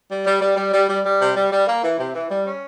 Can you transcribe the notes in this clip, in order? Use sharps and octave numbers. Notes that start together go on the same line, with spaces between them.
G3
G3
G3
G3
G3
G3
G3
C3
G3
G3
A#3
E3
C3
E3
G3
C#4